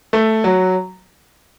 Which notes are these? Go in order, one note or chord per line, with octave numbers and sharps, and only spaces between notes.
A3
F#3